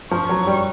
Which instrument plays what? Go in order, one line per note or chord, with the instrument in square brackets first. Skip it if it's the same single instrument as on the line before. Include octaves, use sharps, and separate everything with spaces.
[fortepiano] F3 [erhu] C#6
[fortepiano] F#3
G3